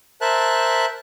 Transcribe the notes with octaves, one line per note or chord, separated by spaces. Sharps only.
A#4 C5 E5 A5 F#6